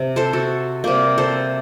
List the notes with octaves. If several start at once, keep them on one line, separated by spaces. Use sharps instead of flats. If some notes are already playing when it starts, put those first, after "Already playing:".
Already playing: C3
A4 C5
F#4 A4
C3 G3 A#3
A4 C5